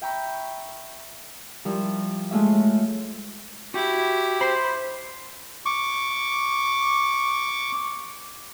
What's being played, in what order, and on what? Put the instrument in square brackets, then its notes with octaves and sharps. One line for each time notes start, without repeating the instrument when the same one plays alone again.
[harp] E5 G5 A#5 B5 C#6
F3 G3 E4 A#4
G#3 A3 F4 C#5 E5
[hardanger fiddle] E4 [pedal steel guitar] F#4 [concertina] G4
[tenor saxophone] C5 [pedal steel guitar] B5 C6
[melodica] C#6 D6